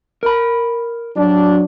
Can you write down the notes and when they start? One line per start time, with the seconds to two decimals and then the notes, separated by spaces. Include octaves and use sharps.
0.23 A#4 B5
1.17 F#3 D4